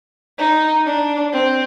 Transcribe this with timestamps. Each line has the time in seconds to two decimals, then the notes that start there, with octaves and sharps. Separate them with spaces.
0.39 D#4
0.86 D4
1.33 C4